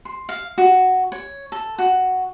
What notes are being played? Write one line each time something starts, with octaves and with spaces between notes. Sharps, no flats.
C6
F5
F#4
C#5
A4
F#4